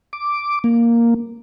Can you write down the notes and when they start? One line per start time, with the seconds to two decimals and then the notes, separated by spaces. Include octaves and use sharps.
0.13 D6
0.64 A#3